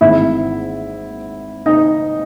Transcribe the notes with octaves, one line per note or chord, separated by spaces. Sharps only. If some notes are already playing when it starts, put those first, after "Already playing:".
G#1 G#2 E3 E4 E5
D#4 D#5